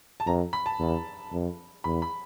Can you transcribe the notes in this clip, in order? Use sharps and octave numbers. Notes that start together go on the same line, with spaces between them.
A5
F2 A#5
B5
A5
E2
F2
E2 B5
B5